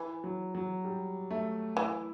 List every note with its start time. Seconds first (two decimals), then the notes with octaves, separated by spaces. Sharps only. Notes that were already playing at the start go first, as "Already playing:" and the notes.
Already playing: E3
0.24 F#3
0.55 F#3
0.85 G3
1.30 A3
1.77 E3 E4